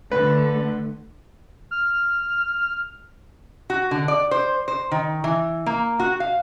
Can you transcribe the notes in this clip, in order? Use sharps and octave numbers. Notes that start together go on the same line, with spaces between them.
D3 A3 B4
F6
F#4
D3
D5
C5
C5
D#3
E3
A#3
F#4
F5